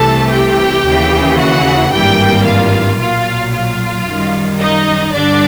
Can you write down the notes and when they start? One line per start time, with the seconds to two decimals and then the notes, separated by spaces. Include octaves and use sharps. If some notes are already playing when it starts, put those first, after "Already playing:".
Already playing: C2 C3 E3 A3 A4 A5
0.31 G4 G5
0.85 D#2 C#3 E3
1.39 F#4 F#5
1.92 G#1 G2 E3 G3 A#3 G4 G5
2.45 F4 F5
2.99 B1 A#2 F#3 F4 F5
3.53 F4 F5
4.06 F#2 D#3 G3
4.60 D#4 D#5
5.13 G2 D3 G3 D4 D5